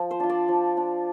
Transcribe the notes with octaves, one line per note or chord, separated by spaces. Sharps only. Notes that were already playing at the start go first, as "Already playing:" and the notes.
Already playing: F3
C5
D4 F4
D5
F3
D4 F4